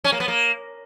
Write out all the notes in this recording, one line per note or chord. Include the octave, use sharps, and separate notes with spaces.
C#4
A#3
B3
A#3